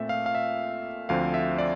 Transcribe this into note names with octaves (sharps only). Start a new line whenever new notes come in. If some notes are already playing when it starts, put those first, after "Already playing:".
Already playing: A#2 A3 C4 E5
F5
F5
E5
D2 D3 F3 C4 F5
E5
D5